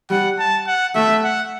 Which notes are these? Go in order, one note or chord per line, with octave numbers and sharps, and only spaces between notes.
G3 F#5
A5
F#5
A3 E5
F#5